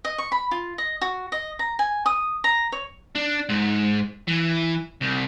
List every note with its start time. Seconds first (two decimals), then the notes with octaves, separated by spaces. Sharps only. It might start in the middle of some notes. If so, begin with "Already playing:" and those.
0.05 D#5
0.18 C#6
0.32 B5
0.51 F4
0.78 D#5
1.01 F#4
1.32 D#5
1.59 A#5
1.79 G#5
2.06 D#6
2.44 A#5
2.72 C#5
3.15 D4
3.49 G#2
4.28 E3
5.02 C2